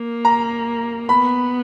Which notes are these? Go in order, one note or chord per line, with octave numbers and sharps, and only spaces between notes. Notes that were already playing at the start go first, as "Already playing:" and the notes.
Already playing: A#3
A#5
B3 B5